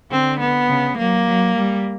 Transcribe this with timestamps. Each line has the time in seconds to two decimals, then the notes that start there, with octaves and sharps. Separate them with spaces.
0.11 D3 C4
0.39 B3
0.69 C#3
0.97 F#3 A#3
1.26 F#3
1.55 G3